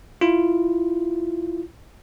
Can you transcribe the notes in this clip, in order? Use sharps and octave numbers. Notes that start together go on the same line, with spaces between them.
E4 F4